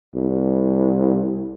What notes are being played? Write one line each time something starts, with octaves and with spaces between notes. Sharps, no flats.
C2